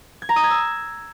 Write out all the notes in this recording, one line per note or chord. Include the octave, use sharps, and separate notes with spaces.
G#6
A#5
D#6
G#6
E6